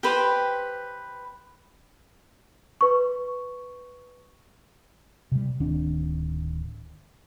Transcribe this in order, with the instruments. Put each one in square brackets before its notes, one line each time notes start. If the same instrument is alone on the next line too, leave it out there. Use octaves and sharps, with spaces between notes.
[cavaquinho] G4 B4 C5 G5
[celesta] B4 C#6
[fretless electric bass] C3 G3
D1 D#3 C4 D4